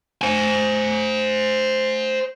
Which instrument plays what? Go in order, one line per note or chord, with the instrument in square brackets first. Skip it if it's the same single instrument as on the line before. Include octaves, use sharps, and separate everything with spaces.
[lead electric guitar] C5 G#5